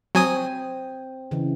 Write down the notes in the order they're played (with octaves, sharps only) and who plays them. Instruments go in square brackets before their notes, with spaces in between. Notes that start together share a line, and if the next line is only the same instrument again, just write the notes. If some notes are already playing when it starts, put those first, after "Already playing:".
[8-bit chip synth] F#3 G#5 D#6 [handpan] C4
[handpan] C#3 E3